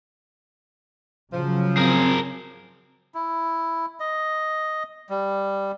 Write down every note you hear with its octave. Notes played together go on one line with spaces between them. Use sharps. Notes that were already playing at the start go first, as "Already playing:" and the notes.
C#3 F3 F#3
C4 G#4 A#4
E4
D#5
G3